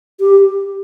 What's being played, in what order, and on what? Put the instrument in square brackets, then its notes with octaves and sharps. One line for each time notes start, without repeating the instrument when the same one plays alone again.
[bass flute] G4